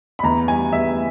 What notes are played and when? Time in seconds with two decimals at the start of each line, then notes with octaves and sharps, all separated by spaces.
0.19 B5
0.23 E2 A#5
0.48 G3 G#5
0.73 E2 E5